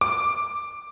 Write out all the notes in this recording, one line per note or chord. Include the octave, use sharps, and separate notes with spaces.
D6